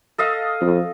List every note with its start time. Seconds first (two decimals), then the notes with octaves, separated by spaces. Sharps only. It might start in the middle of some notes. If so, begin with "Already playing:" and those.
0.18 A4 D#5 F5
0.61 F2